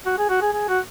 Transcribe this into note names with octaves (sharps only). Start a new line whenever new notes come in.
F#4
G#4
F#4
G#4
G#4
F#4